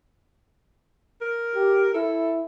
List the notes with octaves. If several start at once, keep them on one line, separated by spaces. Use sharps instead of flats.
A#4
G4
E4 A4